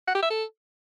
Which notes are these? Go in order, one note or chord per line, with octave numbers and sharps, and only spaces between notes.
F#5
G4
E5
A4